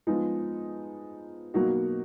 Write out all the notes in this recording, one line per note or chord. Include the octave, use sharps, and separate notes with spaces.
F3 G#3 B3 D#4
B2 F#3 A#3 D#4 F#4